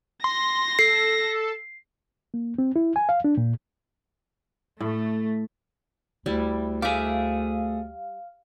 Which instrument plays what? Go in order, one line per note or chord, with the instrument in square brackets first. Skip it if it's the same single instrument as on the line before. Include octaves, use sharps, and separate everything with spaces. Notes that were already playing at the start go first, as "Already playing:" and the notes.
[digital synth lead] C6 [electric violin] A#6
[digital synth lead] A4 [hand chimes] C7
[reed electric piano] A#3
C4
E4
G#5
F5
D4
A#2
[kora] A2 [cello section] A3
[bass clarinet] D2 [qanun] G3 E4
[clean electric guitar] A3 G#4 [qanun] E5 D6 [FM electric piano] F5